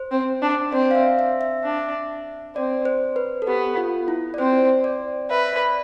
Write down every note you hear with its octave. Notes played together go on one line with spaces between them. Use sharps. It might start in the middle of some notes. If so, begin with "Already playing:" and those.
Already playing: C5
C4
D4
C4 D5
F5
E5
E5
E5
D4
C4 D5
C5
B4
A4
B3 G4
F4
E4
D5
C4 C5
D5
B4 E5
D5